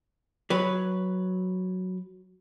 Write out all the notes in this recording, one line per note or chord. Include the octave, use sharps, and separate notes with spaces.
F#3 B4